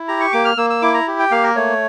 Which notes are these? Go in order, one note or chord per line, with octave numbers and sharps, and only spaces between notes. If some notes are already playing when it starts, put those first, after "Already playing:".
Already playing: E4
G4 A#5
C#6
A#3 D6
F6
A#3 E6
E6
E4 D6
A#5
G4
G5
A#3 F5
A#4
A3 C#5